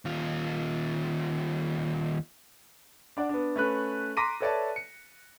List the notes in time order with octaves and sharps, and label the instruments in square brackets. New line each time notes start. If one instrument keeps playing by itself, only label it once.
[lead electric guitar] D#2 F4
[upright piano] D4 D5 F#5
B3 D4
A3 C#4 B4 F#6
A#5 C6 D6 A#6 B6 D#7
A4 B4 C#5 D5 E5 A5
C#7